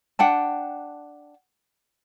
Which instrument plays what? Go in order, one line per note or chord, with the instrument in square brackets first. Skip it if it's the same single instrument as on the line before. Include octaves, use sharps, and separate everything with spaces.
[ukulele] D4 F#5 G5 A5